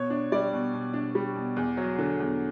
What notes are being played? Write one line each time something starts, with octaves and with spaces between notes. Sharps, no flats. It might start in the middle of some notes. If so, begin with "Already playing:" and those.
Already playing: B2 C#5
D4
G3 D5
B2
B2
D4
G3
B2
E2
F#3
D3
E2